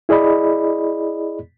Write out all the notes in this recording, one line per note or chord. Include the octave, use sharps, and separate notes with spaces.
E4 G#4 D5 D#5 B5